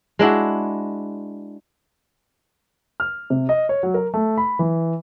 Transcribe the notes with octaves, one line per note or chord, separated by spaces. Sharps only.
G#3 D4 E4 F#4
F6
C3
D#5
C#5
F#3
A#4
A3
B5
E3